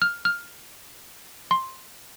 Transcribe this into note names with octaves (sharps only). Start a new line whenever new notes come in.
F6
F6
C6